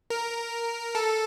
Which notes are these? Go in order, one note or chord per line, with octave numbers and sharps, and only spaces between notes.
A#4
A4